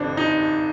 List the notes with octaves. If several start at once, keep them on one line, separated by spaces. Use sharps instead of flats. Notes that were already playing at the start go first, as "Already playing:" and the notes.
Already playing: A1 G2 D3 C4 D4
D#4